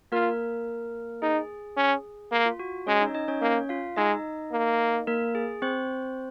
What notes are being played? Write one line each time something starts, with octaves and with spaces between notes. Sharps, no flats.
A#3 F4 A#4
D#4 G#4
C#4
A#3
F4
F#4
G#3 C#4 C#5
D#4 D#5
D#4 D#5
C#4 C#5
A#3 C#4 C#5
F4 F5
G#3 D#4 D#5
A#3
A#3 A#4
G#4
C4 C5